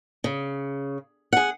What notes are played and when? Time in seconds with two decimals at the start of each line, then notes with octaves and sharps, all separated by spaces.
0.24 C#3
1.33 G#4 F#5